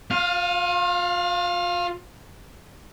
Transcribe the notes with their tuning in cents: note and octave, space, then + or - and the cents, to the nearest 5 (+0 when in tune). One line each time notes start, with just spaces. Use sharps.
F4 +35 F5 +0